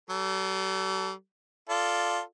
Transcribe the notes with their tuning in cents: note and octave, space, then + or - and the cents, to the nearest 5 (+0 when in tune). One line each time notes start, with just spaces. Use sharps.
G3 -45 A4 +0
F4 +0 A4 +0 D5 +0